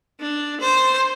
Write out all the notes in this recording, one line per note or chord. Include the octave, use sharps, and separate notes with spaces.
D4
C5